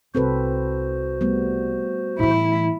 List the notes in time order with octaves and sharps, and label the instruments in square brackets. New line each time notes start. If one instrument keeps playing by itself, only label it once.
[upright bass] C2 [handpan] C4 A4 B4 [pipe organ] F#4 C5
[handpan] G3 A3 B3
[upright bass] A2 E3 [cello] E4